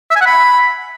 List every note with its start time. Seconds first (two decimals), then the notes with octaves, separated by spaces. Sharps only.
0.11 E5
0.16 G#5
0.21 F#5
0.26 B5